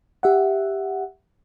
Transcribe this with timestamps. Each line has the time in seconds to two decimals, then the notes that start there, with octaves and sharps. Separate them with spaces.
0.23 G4 E5 F#5